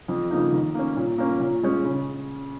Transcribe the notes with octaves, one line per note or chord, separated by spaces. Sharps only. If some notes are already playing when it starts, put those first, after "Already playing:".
F2
C#3 F3 A#3 D#4
D#3
A#3 C#4
A#2
A#3 C#4
A#2
G#3 C#4
C#3